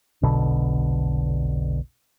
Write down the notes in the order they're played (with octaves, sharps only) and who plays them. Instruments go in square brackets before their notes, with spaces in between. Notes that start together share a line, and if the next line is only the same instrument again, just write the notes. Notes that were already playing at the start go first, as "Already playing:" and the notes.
[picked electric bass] F1 B1 B2 D3